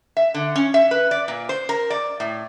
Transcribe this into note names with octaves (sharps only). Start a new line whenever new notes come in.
E5
D3
C#4
E5
B4
D5
A#2
C5
A#4
D5
A2